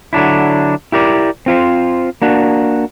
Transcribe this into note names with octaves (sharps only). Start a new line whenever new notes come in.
D3 F#3 D4 E4
E4 G4 A#4 D5
C4 F4 C5
A#3 D4 F#4